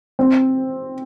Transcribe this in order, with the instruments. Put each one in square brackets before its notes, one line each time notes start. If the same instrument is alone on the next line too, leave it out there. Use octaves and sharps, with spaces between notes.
[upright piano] C4